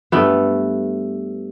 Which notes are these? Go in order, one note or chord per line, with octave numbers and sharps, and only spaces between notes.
G2 A3 B3